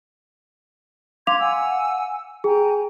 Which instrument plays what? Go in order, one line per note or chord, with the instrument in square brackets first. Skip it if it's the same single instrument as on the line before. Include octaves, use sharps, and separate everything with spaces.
[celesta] F5 D6 F7 [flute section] C6 G#6
[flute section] F#5 G#5 E6
[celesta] G#4 [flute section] G5 G#5 A#5